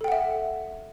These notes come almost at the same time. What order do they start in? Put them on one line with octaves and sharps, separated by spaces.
A4 G5 F#5 E5